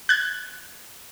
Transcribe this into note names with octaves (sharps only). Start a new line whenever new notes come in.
F#6 G#6